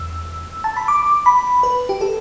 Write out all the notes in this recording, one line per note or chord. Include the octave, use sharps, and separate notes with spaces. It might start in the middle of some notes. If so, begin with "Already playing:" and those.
Already playing: E2 E6
A5
B5
D6
B5
B4
G4
A4